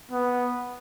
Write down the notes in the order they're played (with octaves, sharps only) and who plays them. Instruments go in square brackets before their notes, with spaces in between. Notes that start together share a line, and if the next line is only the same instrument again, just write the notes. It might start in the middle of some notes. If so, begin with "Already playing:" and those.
[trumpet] B3